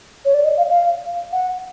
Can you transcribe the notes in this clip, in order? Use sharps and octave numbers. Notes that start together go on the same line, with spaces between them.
C#5
D5
D#5
F5
F5
F#5